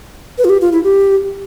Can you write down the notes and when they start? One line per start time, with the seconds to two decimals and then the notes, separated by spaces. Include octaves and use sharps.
0.38 B4
0.45 F4
0.49 G4
0.61 F4
0.72 E4
0.84 G4